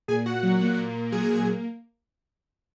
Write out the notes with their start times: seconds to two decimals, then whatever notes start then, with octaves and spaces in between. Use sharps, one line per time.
0.08 A#2 G#4 G#5
0.26 A#2 F#4 F#5
0.43 F#3
0.61 A#3
0.77 A#2
0.95 A#2
1.12 F#3 G#4 G#5
1.23 G#4 G#5
1.29 A#3
1.34 G#4 G#5